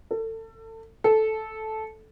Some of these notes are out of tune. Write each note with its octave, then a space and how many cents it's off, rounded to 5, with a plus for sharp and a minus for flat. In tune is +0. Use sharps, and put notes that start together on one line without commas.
A4 +30
A4 -10